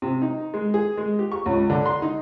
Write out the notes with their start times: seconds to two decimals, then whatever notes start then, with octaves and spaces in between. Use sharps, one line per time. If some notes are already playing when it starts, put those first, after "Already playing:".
0.02 C3
0.22 D#4
0.54 G#3
0.74 G#4
0.97 G#3
1.19 G4
1.32 C#6
1.46 C#2
1.70 D3
1.86 C6
2.02 D#4